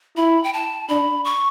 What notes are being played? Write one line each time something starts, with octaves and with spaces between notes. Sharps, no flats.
E4 B5
G5
A5
D4 B5
C#6